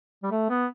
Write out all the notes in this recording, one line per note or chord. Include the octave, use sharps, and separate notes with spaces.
G3
A3
B3